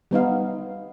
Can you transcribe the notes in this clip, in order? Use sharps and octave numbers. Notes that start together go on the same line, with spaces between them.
G3 B3 D#4 F5